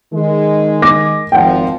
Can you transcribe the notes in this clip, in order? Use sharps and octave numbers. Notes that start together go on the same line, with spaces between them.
D#3 G#3
D6 A#6
G#1 F3 F#5 G5